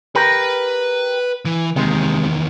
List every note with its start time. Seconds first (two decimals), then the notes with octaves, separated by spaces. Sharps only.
0.15 G4 A#4 B4 B5
1.45 E3
1.76 E2 C3 D#3 G#3